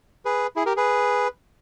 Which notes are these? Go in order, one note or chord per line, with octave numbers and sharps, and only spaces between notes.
G#4 B4
E4 G#4
G4 A#4
G#4 B4